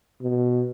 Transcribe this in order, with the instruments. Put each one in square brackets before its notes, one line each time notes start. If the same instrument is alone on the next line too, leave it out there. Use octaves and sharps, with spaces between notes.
[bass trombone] B2